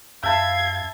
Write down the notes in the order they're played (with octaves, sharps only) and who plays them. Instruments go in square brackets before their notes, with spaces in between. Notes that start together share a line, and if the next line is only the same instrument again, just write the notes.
[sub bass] F#2 [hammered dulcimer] E5 A5 B5 [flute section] F5 [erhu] G#6